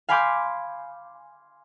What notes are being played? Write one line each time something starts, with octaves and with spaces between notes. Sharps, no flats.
F5 G#5 B5 C6 D6 G6